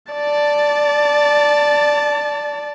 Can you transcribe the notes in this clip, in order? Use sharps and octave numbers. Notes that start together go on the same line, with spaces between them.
D5 A5